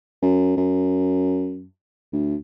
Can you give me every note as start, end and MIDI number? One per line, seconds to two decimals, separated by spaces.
0.22 0.54 42
0.56 1.64 42
2.12 2.35 38